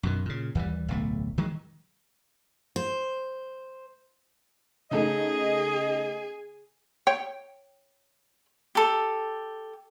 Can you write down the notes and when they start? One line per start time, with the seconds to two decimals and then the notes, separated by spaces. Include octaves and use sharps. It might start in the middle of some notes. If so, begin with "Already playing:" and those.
0.03 F#2 B2 D#3
0.25 A#2 C#3
0.55 D#2 E3 G3
0.88 D1 B1 A3
1.38 D#3 F#3 G#3
2.76 C5
4.91 C#3 A3 D#4 G#4 D#5
7.07 C#5 G5
8.75 G4 A4